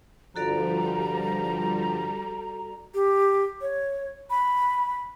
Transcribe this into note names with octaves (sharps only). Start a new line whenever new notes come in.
G2 D3 F3 G3 F#4 A4 D5 A#5
G4
C#5
B5